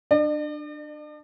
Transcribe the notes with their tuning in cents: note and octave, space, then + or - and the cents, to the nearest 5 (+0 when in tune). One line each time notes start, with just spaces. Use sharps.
D4 +20 D5 +45